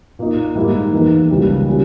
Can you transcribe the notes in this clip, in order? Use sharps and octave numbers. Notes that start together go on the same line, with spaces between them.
A#2 A#3 D#4
G#2 D#3 G3 A#3 E4
E2 D#3 A#3
C#2 C#3 E3 G3 A#3
A#2 G3 C#4